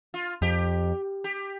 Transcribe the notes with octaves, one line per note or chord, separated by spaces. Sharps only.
F4
F2 G4
G4